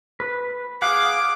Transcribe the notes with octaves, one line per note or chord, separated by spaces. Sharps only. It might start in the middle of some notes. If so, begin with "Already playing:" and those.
B4
G#4 F5 F#5 D6